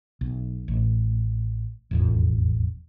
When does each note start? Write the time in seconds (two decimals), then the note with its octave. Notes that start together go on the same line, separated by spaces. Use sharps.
0.21 B1
0.68 A1
1.91 E1 A1 F2